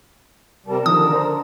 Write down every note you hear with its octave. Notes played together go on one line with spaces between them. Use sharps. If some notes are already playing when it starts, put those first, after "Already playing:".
C3 G3 A#4 A5
D3 D#3 F3 D#6
D4 C5 A#5